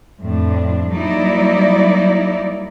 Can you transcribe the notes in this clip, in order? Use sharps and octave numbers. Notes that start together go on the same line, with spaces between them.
F2 A2 D4
F#3 G3 A#3 D#4 E4 D5